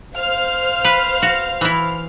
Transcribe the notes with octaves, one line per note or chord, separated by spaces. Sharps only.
C5 F5 F6
B4
F#4
E3 E4